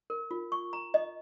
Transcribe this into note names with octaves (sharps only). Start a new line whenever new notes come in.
A#4
F4
C#6
A#5
D#5